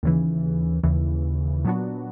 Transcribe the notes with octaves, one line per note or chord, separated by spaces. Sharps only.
D#2 C#3 E3
D#2 C#3 E3
A#2 F#3 B3 D4 F#4